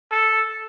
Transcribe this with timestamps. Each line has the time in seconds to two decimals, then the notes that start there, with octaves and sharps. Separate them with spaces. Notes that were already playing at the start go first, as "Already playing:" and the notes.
0.12 A4